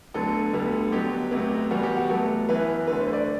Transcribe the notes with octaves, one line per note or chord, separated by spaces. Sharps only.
D2 D3 F#3 B3 A4
D2 D3 G3 B3
B2 F#3 B3 G4
D2 C3 F#3 B3
E2 B2 G3 B3 F#4
G4
F#4
A2 F#3 B3 A4
F#2 E3 B3 B4
D2 D3 A3 B4
C5
D5